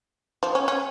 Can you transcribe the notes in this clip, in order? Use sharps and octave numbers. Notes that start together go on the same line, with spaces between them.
F3
C#4
C#4